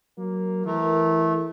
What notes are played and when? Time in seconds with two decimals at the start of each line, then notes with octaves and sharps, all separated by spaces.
0.18 F#3 A#3
0.66 E3 A3 A#4